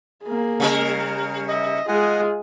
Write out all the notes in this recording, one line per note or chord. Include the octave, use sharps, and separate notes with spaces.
A#3 G#4
C#3 G3 A#4
A#5
D#5 E5
G#3 F4 G#4 D#5 F#5 G#5